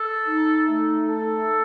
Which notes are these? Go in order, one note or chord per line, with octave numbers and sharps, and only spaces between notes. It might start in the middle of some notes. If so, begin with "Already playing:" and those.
Already playing: A4
D#4
A3
A4